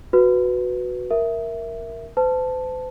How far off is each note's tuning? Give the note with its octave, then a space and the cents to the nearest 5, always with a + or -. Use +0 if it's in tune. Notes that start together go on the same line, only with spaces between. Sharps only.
F#4 -5 B4 +0
A#4 +0 E5 +0
C5 -45 A5 +0